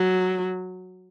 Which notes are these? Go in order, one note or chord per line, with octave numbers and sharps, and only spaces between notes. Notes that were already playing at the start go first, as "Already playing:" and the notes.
Already playing: F#3